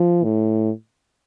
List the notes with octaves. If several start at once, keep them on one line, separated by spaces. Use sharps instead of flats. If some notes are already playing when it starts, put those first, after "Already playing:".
Already playing: F3
A2